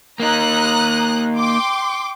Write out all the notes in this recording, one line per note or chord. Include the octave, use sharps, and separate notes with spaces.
A#3 D#4 A#5 D#6 F#6
G5 C6 D6